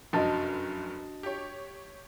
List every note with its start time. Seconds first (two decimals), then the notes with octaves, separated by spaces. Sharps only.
0.13 F1 F#2 D4 F#4 D#5 A5 A6
1.23 G4 C#5